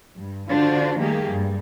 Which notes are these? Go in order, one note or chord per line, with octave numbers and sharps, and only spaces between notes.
G2
D3 D4 F4 F#4 C5
D#3 G3 A3 A#3 G4 G#4
G2 G3